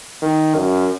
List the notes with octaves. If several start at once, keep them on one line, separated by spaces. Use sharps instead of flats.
D#3
F#2